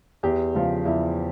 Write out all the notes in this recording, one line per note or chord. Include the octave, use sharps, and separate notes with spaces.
E2 G4
C#3 F3
E2 E4